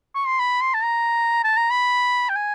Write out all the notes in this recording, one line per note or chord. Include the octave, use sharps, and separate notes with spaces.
C#6
C6
B5
C6
A5
A#5
A5
A#5
B5
G5
G#5